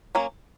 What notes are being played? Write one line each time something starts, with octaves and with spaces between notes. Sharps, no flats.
F#3 A#3 C#4